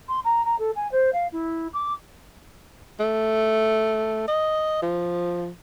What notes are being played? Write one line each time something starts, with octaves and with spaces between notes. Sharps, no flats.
C6
A#5
A#5
A4
G#5
C5
F5
E4
D6
A3
D#5
F3